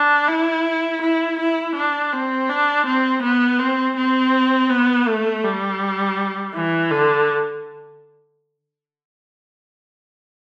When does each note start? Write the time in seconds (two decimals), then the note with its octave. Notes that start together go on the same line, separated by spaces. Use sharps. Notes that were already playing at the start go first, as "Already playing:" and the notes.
Already playing: D4
0.28 E4
1.01 E4
1.39 E4
1.75 D4
2.12 C4
2.49 D4
2.86 C4
3.23 B3
3.59 C4
3.96 C4
4.70 B3
5.07 A3
5.44 G3
6.55 E3
6.91 D3